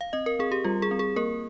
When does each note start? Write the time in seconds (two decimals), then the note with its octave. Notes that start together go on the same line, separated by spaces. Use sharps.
0.01 F5
0.13 C4 D#5
0.26 A#4
0.39 C4 G#4
0.52 G4
0.64 G3 F4
0.82 G#4
0.91 C4
0.99 G#4
1.16 A#3 A#4